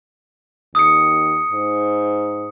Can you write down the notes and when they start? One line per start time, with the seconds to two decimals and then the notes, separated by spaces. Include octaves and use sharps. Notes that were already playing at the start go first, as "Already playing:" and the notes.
0.75 D#2 D#6 C#7
1.51 G#2